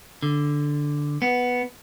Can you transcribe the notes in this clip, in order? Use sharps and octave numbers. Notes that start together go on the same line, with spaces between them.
D3
B3